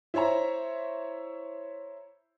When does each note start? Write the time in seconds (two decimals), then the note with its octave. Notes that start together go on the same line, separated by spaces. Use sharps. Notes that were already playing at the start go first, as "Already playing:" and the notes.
0.14 E4 C5 C#5 E5 A#5